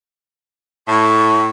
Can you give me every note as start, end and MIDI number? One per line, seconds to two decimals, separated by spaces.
0.88 1.50 45
0.88 1.46 85